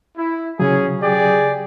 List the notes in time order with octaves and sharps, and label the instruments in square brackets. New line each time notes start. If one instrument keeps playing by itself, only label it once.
[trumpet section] E4
[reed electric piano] C#3 F#3 [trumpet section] C#4 G#4
[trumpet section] G4 G#4 D5